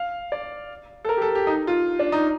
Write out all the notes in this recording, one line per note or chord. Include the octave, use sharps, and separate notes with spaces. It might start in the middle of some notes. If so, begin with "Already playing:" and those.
Already playing: F5
D5
A4
A#4
G4
A4
G4
D#4
F4
D4
D#4